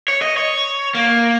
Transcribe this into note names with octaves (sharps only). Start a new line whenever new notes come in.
C#5
D#5
C#5
A#3